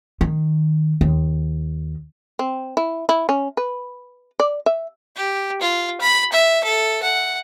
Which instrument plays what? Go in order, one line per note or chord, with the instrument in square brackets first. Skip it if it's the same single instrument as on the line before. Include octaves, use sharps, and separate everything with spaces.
[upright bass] D#3
D#2
[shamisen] C4
E4
E4
C#4
B4
D5
E5
[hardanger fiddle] G4
F4
B5
E5
A4
F#5